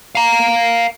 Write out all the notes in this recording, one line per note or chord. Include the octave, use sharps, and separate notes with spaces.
F5 A#5